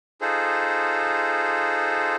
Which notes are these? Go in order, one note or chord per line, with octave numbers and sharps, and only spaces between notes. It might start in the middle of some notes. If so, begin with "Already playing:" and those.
D#4 F4 G#4 A4 C5